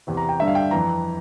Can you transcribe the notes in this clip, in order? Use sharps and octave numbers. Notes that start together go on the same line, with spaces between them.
E2 C3 E3
A#5
G5
G2 D3 E5
F5
G5
F2 E3 A#5